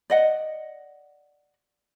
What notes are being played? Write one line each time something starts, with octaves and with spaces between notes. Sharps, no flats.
D5 D#5 F#5